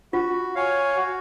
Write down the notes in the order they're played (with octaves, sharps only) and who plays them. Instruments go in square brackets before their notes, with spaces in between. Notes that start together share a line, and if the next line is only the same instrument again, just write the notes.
[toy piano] F4 [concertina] F#4
[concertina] C#5 F5 G#5
F#4